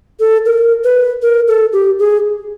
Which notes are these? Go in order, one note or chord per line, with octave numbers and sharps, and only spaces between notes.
A4
A#4
B4
A#4
A4
G4
G#4